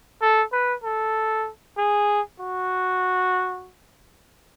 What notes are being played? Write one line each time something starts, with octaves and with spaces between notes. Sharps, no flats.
A4
B4
A4
G#4
F#4